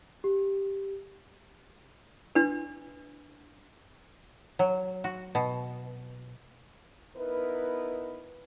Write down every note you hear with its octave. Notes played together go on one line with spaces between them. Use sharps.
G4
D4 B4
F#3
F#4
B2
B3 D#4 E4 A#4 B4